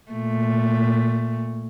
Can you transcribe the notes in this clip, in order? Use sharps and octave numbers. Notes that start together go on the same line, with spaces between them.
A#2 A3